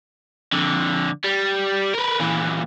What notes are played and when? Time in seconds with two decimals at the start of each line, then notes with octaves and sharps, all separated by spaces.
0.53 F2 D3
1.24 G3
1.95 A#4 B4
2.20 A#2 E3